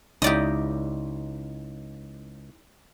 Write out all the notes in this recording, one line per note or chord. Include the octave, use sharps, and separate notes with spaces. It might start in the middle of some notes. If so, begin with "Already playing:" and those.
C#2 D#4 E4 G4 D5 D#5